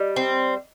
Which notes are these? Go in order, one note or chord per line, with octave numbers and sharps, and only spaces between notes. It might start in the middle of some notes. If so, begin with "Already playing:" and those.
Already playing: G3 D#5
C4